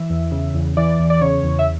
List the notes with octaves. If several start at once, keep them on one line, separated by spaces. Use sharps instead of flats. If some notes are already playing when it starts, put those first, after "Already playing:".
Already playing: E3 E5
E2
C#3
E2
E3 D5
E2
D5
C#3 C#5
E2
E5